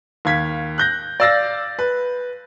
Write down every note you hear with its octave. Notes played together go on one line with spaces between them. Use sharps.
D#2 F5 G#6 B6
F#6 G6 A#6
D5 F5 E6 A6 A#6
B4